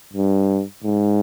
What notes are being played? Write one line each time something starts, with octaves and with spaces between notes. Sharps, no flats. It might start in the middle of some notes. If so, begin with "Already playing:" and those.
G2
G#2